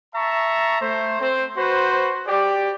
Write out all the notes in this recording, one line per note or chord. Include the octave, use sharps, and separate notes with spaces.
E5 A5 A#5 C#6
A3 C5
C4 C5
F#4 B4 C5
G4 D5